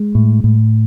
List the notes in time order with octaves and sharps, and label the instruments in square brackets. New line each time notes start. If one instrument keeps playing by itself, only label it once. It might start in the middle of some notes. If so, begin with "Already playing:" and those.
Already playing: [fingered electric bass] G#3
A2
A2